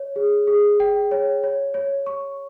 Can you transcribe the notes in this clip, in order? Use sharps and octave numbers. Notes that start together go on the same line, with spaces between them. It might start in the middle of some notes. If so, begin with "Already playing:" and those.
Already playing: C#5
G#4
G#4
G5
C#5
C#5
C#5
C#6